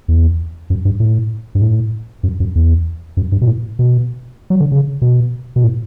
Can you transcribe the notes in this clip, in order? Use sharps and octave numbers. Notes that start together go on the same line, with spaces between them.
E2
F#2
G2
A2
G2
A2
F#2
F#2
E2
F#2
G2
B2
A2
B2
F#3
D3
C#3
B2
B2
A2